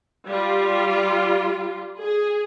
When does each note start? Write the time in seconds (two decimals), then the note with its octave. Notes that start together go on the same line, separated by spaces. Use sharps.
0.26 G3 F4
1.99 G#4